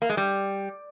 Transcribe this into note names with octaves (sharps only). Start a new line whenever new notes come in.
A#3
G#3
G3